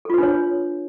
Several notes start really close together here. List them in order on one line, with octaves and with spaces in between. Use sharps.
A4 F4 B4 D4 C#5